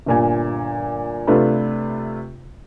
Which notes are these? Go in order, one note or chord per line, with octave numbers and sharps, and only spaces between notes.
G1 A#2 G#5
C3 A3 D4 F4 B4